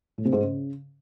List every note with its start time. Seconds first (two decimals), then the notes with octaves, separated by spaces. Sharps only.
0.18 A2
0.25 C3
0.33 G#2
0.40 C#3